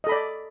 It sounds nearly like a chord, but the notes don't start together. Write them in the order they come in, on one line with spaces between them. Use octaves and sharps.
D#5 A4 B5 D5